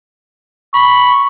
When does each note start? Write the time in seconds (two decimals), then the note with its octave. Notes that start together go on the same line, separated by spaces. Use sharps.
0.74 B5 C#6